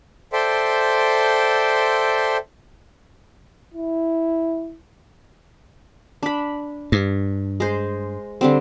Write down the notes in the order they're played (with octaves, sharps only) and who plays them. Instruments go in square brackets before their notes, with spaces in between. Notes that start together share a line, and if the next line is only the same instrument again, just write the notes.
[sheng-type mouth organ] A4 C5 D5 E5 G5 C6
[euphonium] E4
[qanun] D4 B5
[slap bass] G2
[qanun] G#3 C5
D3 G3 C4